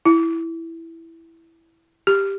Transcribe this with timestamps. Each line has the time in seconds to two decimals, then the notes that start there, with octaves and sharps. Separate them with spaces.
0.06 E4
2.07 G4